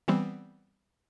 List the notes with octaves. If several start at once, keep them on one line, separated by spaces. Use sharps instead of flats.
E3 G3 B3 C4